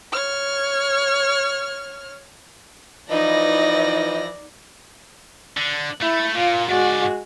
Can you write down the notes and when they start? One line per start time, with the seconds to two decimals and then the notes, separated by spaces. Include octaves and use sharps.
0.13 C#5 F6
3.10 E3 F3 D#4 D5 D#5 A#6
5.57 D3
6.02 A3 E4
6.35 A#2 F4
6.69 G#2 G#3 F#4 D5